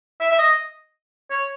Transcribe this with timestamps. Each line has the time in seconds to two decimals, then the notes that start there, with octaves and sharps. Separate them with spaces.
0.20 E5
0.31 E5
0.39 D#5
1.30 C#5